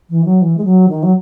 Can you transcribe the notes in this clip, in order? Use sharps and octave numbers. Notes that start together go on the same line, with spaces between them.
E3
F#3
E3
G#3
F#3
D#3
F#3